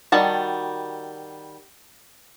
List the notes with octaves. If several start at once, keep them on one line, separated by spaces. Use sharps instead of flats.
D#3 G3 F#4 A5